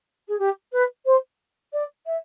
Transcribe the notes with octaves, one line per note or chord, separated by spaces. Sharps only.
G#4
G4
B4
C5
D5
E5